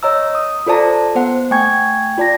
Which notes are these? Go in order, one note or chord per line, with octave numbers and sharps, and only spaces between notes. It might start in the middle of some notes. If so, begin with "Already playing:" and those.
C#5 D#5 A#5 E6
D#6
F4 A4 C5 D5 A5 A#5
B3 C5 F#5
A3 G5 G#5 C#6 G#6
F4 D5 A5 A#6